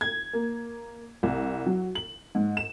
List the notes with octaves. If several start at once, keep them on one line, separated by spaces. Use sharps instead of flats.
G#6
A#3
C2
F#3
F#7
G#2
E7